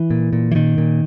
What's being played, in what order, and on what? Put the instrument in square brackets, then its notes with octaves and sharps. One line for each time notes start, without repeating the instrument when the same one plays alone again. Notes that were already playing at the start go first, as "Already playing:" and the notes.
Already playing: [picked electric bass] E3
A#2
A#2
E3
A#2 D#3
A#2